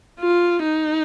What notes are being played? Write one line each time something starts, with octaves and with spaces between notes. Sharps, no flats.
F4
D#4